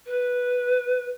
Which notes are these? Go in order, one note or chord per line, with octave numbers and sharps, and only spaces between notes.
B4